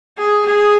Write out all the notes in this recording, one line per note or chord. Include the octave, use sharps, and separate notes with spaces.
G#4
G#4